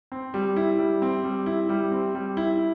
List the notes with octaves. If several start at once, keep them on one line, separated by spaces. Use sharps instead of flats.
C4
G3
E4
G3
C4
G3
E4
G3
C4
G3
E4